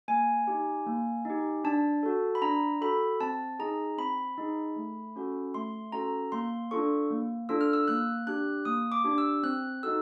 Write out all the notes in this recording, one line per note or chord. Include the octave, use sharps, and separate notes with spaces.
A#3 G#5
D#4 G4
A#3
D#4 G4
D4 A5
F#4 A4
B5
D4 A#5
F#4 A4 B5
C4 A5
D#4 G#4 A#5
C4 B5
D#4 G#4
A3
C#4 F#4 A4
A3 C6
C#4 F#4 A4 A#5
A#3 C6
D4 F4 A4 C#6
A#3
D4 F4 A4 E6
F6
E6
A#3 F#6
D4 G4 F#6
A#3 D#6
D6
D4 G4
E6
C4 F#6
D#4 F#4 A4 E6